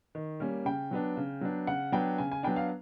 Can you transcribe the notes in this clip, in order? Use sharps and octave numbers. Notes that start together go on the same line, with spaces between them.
D#3
G3 A#3 C#4
C#3 G5
F#3 B3 D4
C#3
F#3 B3 D4
C#3 F#5
F#3 B3 D4 G5
C#3 G#5
G#5
F#3 B3 D4 G5
F5